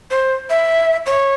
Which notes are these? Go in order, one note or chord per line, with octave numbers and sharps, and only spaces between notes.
C5
E5
C#5